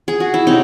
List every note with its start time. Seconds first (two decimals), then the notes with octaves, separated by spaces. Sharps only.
0.08 G#4
0.20 F#4
0.34 E4
0.47 C3 F#3 C4 D#4